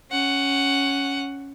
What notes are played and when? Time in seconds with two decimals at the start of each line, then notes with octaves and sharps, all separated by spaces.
0.11 C#4 F#5